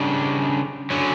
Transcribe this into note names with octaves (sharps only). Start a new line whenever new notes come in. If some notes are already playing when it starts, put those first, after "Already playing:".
Already playing: C#3 G3 D4
D3 F#3 C#4